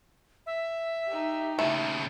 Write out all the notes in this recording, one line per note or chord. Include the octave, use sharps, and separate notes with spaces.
E5
D#4 G4
D#2 C#3 A3